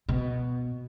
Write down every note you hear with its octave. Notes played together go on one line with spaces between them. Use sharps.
B2